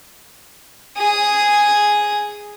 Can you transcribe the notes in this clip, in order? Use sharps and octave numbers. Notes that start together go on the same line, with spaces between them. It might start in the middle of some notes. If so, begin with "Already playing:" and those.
G#4 D#6